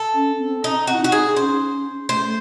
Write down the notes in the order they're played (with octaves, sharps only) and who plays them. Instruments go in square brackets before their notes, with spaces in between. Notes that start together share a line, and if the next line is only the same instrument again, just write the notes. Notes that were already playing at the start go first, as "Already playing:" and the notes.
Already playing: [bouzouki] A4
[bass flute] C#4
C4
[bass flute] C4 [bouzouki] D#4
[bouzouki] F#4
[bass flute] E4
[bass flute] D#4 [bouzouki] F#4
[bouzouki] G#4
[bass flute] C#4 [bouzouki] C5
[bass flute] A3 [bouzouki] C5